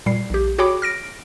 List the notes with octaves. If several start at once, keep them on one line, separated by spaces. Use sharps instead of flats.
A#2 G3 C7
A#1 G4
F#4 G#4 C#5 G5 B5 D6
F6 A#6 D7